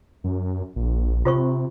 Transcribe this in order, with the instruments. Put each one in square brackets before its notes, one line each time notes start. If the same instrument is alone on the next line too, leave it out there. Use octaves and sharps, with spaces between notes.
[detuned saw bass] F#2
A#1
[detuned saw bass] C3 [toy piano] F4 C5 C#6